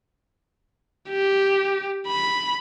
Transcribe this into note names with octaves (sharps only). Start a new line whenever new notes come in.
G4
B5